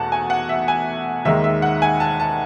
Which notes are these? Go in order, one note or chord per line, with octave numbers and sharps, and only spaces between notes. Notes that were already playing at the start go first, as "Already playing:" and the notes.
Already playing: E2 B2 A3 F#5 A5
G#5
F#5
E5
G#5
D#2 D#3 G#3 E5
E5
F#5
G#5
A5
A5